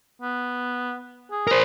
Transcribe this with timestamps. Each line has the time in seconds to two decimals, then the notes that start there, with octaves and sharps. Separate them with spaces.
0.22 B3
1.31 G#4
1.47 A#4 C5